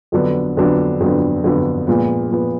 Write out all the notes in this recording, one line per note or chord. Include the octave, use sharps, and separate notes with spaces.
F2 D3 F#3 B3 D4
F2 D3 F#3 B3 D4
F2 D3 F#3 B3 D4
F2 D3 F#3 B3 D4
A#2 F3 G#3 B3
A#2 F3 G#3 B3